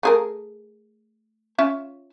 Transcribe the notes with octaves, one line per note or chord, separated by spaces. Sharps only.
A3 G#4 A#4
C#4 F4 E5